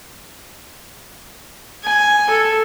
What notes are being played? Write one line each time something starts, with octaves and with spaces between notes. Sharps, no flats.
G#5
A4